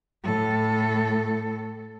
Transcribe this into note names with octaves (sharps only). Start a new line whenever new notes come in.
A2 A4